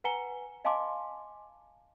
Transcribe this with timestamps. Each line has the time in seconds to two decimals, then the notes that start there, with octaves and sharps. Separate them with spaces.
0.04 B4 F#5 G#5 A#5 C#7 G7
0.65 D#5 F5 G#5 A5 C6 D6